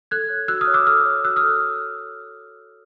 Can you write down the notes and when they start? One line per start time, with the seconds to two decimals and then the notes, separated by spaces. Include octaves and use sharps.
0.11 A4 F#6 G#6
0.30 C#5
0.48 F#4 E6 F#6
0.61 D#6 F6
0.67 C#5
0.74 D6 E6
0.87 A4 D#6 F6
1.05 C#5
1.24 F#4 E6 F#6
1.36 D#6 F6
1.43 A4